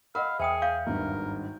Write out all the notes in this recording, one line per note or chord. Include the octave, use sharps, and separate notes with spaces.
A#4 D#5 F5 F#5 B5
E2 G#4 C5 E5 G5 D#6
F5 G6
G#1 G2 A#4